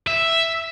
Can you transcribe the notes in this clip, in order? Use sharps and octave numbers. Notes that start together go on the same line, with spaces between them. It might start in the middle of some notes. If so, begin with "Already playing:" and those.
E5